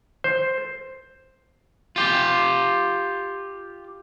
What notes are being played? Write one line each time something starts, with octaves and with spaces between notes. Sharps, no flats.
C5
F4 G4